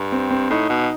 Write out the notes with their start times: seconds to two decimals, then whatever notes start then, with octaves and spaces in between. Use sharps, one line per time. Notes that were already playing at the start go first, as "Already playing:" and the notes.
Already playing: G2
0.12 C4
0.31 C4
0.50 A2 D#4
0.69 B2